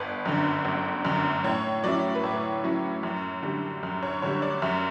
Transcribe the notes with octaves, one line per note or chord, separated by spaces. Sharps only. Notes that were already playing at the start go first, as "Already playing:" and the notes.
Already playing: G1 B4
F#2 D3
G1
F#2 D3
A2 C#5
F#3 C#4 E4 D5
B4
A2 C#5
F#3 C#4 E4
F#2
D3 G3
F#2
C#5
D3 G3 C#5
D5
F#2 E5